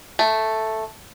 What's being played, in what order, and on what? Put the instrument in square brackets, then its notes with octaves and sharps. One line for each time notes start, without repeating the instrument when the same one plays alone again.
[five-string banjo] A3